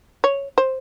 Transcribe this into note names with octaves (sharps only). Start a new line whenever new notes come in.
C#5
C5